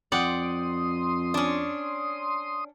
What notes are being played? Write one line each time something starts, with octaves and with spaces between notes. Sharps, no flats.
F2 D5 F#5 G5 C6 D#6
C#4 D4